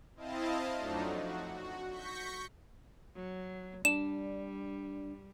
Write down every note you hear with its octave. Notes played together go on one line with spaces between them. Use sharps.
C4 E4 D#5 F5 A5
F2 F3 F#3 A3 D4 D#4
F#4
F#4
C#6 G6 A#6 B6 C#7
F#3
G3 D4 E7